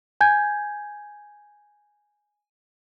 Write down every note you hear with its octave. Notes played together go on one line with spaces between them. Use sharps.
G#5 G6 G#6